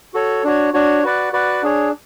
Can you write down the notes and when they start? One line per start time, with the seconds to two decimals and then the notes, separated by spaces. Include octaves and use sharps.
0.14 F#4 A4 C#5
0.44 D4 F#4 C#5
0.74 D4 F#4 C#5
1.03 F#4 B4 D5 F#5
1.33 F#4 B4 D5 F#5
1.62 D4 G#4 C#5